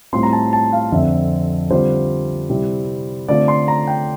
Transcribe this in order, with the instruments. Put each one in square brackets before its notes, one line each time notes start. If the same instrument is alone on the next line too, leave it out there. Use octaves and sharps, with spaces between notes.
[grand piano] A2 G3 C4 F4 C6
A#5
A5
A5
F5
F2 D3 F3 C4 F4 E5
D3 G3 C4 F4 C5
C3 G3 C4 E4
D3 A3 C4 F4 D5
C6
A#5
G5